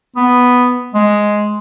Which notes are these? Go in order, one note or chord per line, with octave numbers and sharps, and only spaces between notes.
B3
G#3